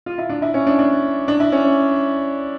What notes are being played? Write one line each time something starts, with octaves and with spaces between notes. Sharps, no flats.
F4
E4
D4
E4
C#4
D4
D4
D4
E4
C#4